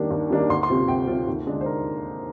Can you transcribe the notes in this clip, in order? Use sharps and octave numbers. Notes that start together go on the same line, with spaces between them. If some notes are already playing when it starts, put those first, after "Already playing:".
Already playing: D#2 D#3 G3 A#3 D4
D#2
D#3 G3 A#3 D4
D2 C6
C6
C3 G3 C4 F4
D2 G5
C3 G3 C4 F4
D#2
D3 G#3 D4
C5
A#4